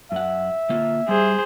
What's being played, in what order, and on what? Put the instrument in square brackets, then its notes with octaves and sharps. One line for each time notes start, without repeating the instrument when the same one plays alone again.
[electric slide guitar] F#2 F#5 [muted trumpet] E5
[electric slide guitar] D3 A#3 F4
[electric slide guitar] G3 [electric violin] G#4 C5